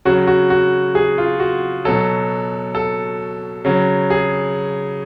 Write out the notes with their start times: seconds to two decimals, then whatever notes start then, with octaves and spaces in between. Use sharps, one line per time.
0.05 C#3 F#3 F#4
0.27 F#4
0.50 F#4
0.95 G#4
1.18 F4
1.40 F#4
1.85 B2 F#3 A4
2.75 A4
3.65 C#3 F#3
4.10 G#4